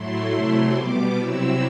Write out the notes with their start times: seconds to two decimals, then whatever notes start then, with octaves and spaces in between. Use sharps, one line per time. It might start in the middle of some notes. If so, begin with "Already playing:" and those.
Already playing: A2 F#3 A3 E4 C6
0.31 C3 F#3 A3 E4
0.74 B2 G3 B3 D6
1.16 C3 F#3 C4 E4 E6